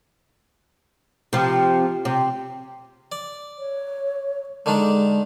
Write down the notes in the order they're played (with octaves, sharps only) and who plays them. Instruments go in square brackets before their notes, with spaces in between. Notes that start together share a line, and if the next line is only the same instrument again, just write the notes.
[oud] C3 F3
C3
[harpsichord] D5
[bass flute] C#5
[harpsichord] D3 D#3 D4 [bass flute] G#3